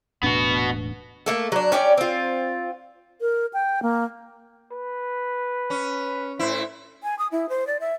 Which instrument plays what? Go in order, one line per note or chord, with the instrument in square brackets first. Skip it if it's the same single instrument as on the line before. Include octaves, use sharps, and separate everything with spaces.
[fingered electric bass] E1 A2 D4 [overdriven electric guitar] B3 F#4
[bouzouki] A3 A#3 A4
F#3 D4
C#4 G4 D5
C4 F4
[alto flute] A#4
G5
A#3
[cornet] B4
[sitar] C#4
[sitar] A2 E4 [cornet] C5
[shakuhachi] G#5
D#6
E4
C5
D5
E5